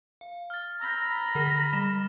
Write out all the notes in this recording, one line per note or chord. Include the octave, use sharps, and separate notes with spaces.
F5
F6 A6
A#5 B5 E6 G6
D3 G#4 F6 A6
G3 E7